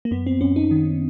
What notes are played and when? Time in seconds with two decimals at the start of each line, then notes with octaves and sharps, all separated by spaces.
0.05 A#3
0.11 F#2 B3
0.27 C4
0.41 F#2 C#4
0.56 D#4
0.71 D#3